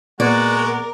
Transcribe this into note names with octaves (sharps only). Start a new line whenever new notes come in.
A#2 G#3 B3 F#4 A#4 D5